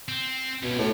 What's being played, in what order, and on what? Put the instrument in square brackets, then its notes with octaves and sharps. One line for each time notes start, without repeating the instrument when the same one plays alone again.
[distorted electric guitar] C4
[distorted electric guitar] C#2 [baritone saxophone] B2
[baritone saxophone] A2